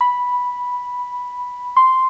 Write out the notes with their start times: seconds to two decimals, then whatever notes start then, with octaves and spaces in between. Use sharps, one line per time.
0.01 B5
1.76 C6